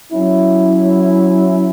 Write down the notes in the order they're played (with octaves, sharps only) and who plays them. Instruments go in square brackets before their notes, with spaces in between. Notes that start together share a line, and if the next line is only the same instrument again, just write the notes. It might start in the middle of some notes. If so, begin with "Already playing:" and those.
[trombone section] F#3 C#4 E4